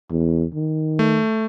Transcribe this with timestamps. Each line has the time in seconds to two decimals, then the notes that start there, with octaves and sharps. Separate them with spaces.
0.11 E2
0.54 D#3
0.99 A3